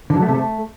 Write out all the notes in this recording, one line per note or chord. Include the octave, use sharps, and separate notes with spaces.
D3
F#3
A3
C3
A3